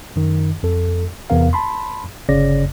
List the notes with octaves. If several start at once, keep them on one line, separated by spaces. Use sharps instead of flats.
F#2 D#3
F2 A4
E2 C3 B3 A#4 F5
A5 B5 C6
G1 C#3 C#5 D5 A#6